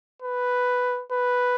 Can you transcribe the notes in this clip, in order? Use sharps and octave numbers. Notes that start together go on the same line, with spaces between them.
B4
B4